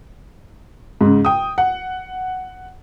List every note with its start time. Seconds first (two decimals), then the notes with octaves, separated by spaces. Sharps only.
1.01 G#2 C#3
1.25 G5 D#6
1.58 F#5